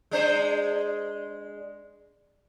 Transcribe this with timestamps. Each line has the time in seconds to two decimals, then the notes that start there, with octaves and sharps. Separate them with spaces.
0.11 G#3 D4 C5